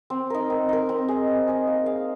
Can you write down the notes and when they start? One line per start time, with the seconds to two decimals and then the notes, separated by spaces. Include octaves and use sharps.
0.10 C4
0.30 D#4 A#4
0.50 C4
0.69 D#4 A#4
0.89 C4
1.08 G#4 D#5
1.28 C4
1.47 G#4 D#5
1.67 A#3
1.86 G#4 F5